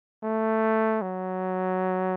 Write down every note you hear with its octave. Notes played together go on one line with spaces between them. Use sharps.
A3
F#3